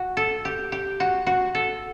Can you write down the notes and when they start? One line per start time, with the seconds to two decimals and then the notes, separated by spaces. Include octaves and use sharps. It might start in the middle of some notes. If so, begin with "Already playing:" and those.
Already playing: F#4
0.17 A4
0.45 G4
0.72 G4
1.00 F#4
1.27 F#4
1.55 A4